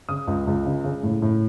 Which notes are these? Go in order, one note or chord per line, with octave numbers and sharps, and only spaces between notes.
C#3 D#6
C#2
C#2
C#3
C#3
A2
A2